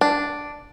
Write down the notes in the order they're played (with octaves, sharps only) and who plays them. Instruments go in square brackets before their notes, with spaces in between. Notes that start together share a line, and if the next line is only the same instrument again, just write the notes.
[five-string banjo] D4